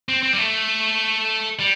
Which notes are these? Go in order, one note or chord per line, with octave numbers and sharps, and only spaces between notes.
C4
C4
G3
A3
G3